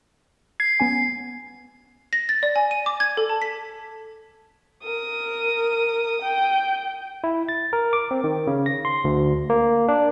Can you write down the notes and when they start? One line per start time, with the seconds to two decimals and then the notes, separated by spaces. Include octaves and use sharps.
0.60 G#6 C7
0.80 B3 C#4 G#5
2.13 A#6
2.29 A6
2.43 D5
2.56 G#5
2.71 D#7
2.86 D6
3.00 G#6
3.17 A4
3.29 A5
3.42 B6
4.82 A#4 D#6
6.22 G5
7.24 E4
7.49 A6
7.73 A#4
7.93 D6
8.11 C4
8.24 D#3
8.47 C#3
8.66 A#6
8.85 C6
9.04 D2
9.50 A#3
9.88 D4